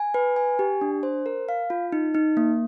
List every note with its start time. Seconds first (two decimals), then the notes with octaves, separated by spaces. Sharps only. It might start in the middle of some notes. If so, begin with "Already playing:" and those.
Already playing: G#5
0.14 B4
0.36 G#5
0.59 G4
0.81 D4
1.03 C5
1.26 A#4
1.49 F5
1.70 F4
1.92 D#4
2.15 D#4
2.37 A#3